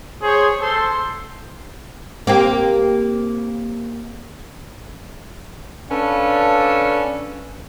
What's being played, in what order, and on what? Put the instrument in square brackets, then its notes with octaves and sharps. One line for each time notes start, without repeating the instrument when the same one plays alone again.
[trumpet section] G#4 C5 C#5
A4 C5 C6
[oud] A#3 C4 G4
[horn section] C#4 D4 A4 B4 F5